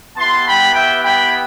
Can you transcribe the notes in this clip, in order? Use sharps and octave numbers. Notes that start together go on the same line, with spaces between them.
B3 E4 G4 A5 C6
G5 B5
E5 G5
G5 B5